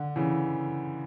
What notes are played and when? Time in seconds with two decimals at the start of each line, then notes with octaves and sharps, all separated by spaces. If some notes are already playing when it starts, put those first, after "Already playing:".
Already playing: D3
0.16 C#3 E3